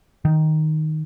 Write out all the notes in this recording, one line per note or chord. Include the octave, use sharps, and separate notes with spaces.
D#3